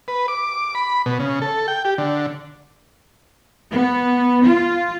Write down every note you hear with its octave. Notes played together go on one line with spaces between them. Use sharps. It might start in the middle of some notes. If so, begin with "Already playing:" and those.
B4
D6
B5
B2
C#3
A4
G5
G4
D3
B3
F4